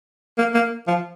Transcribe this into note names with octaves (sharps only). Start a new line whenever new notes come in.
A#3
A#3
F3